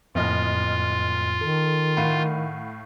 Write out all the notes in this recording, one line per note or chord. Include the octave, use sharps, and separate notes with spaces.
F#1 F2 A2 F4 D#5 F6
D#3 A4
A2 F5 F#5 B5 D#7